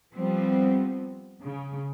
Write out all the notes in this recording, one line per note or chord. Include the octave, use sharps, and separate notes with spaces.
F3 G3 B3 C4
C#3